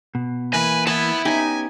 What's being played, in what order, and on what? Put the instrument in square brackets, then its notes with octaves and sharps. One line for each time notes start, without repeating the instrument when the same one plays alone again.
[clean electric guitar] B2
[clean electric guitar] E3 A#3 E4 [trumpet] B4 [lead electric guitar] G#5
[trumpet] B3 [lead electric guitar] E5 B5 [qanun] A5
[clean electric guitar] B3 C#4 G4 [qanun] D#4 [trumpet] G#5